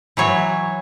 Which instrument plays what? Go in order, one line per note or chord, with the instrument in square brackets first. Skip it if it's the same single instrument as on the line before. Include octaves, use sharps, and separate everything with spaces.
[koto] E3 F#3 C#5